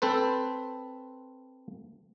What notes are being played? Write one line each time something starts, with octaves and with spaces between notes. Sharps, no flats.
C4 A4 B4 C5